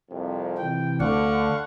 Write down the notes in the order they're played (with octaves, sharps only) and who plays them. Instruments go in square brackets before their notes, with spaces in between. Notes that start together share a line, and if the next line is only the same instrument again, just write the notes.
[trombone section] C2 F2
[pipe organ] C3 E3 [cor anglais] G5
[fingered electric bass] D2 [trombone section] D3 [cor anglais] D5 [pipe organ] F5 F#5 C#6